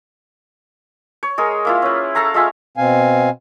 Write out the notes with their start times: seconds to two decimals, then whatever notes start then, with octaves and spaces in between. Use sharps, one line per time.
1.23 C#5
1.38 G#3 G#4 A#4
1.65 A#3 E4 F4
1.82 C#4 B4
2.15 A4 F5 A#5 C#6
2.34 G#3 F4 E5 G#5
2.77 B2 C4 F5 G#5